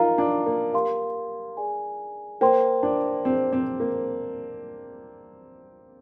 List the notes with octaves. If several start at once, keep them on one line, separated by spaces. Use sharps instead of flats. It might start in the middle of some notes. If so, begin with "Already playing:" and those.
Already playing: D#4 F4 A#4 F5 A#5
D4
A#3
G4 A#4 F5 C6
G#4 D5 G#5
A#3 C5 G5 C6
D4
C4 D4 G#4 C5
C4
A#3